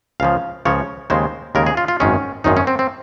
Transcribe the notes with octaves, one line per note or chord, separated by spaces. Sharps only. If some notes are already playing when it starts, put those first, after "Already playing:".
C#2 C#3 F3 F5
C#2 C#3 F3 C#5
D#2 C#3 G#3 C5
D#2 C#3 G#3 A#4
G#4
F4
F4
G#1 F#2 D#3 G#3 C#4
G#1 F#2 D#3 G#3 D#4
C#4
C4
C4